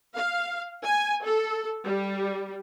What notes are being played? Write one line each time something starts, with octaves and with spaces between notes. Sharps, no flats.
F5
G#5
A4
G3